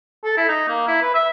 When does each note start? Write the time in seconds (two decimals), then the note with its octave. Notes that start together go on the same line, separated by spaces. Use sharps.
0.24 A4
0.37 E4
0.49 D#4
0.68 A#3
0.88 E4
1.01 B4
1.14 E5